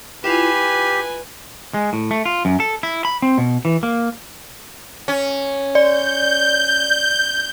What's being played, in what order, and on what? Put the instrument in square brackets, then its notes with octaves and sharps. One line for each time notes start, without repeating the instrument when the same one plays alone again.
[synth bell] E4 F4 [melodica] G4 [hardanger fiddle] B4 G#5
[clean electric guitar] G#3
A2
A3
F4
F#2
A4
E4
B5
C4
B2
E3
A#3
[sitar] C#4
[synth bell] D5 [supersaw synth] G6